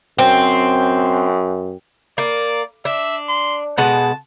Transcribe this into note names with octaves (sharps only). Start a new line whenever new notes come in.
F#2 C4
A#3 D5
D4 E5
C6
B2 G#3 F#5 A5